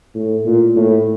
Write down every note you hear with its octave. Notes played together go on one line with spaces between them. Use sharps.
A2
A#2
A2